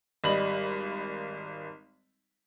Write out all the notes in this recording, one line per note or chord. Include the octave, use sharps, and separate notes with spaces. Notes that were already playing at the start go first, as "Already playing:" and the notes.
G#1 G3 D#5 B5 F#7